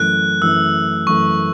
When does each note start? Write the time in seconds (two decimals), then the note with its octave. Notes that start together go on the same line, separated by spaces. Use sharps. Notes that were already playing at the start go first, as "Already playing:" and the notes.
Already playing: F#2 E3 A3 F#6
0.42 F#2 E3 A3 E6
1.07 F#2 E3 A3 C#6